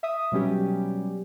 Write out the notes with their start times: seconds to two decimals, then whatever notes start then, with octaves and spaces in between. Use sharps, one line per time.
0.03 E5 D#6
0.32 B2 F#3 G3 C#4 G4